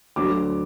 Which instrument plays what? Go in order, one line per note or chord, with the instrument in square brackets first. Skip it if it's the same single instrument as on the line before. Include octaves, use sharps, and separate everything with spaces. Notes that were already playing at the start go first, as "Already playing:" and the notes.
[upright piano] D2 D3 F#3 D6